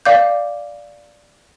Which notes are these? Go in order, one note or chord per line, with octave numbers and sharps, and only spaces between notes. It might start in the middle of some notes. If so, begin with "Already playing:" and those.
D5 F5 D6 G6